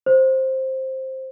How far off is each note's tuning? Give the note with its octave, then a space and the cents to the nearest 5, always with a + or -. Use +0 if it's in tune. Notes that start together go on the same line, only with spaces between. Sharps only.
C5 +10